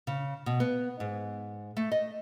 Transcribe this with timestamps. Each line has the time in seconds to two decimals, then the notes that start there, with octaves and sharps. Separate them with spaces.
0.07 C#3
0.46 B2
0.60 B3
1.00 G#2
1.77 A3
1.92 D#5